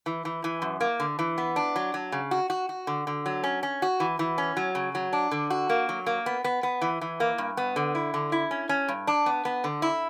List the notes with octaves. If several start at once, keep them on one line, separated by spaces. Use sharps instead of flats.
E3
E3
E3
F#2
A#3
D3
E3
B3
D4
F#3
F#3
C#3
F#4
F#4
F#4
D3
D3
F#3
C#4
C#4
F#4
E3
E3
C#4
F#3
C#3
F#3
D4
D3
F#4
A#3
F#3
A#3
B3
B3
B3
E3
E3
A#3
G2
B3
D3
E4
D3
E4
C#4
C#4
G2
D4
B3
B3
D3
E4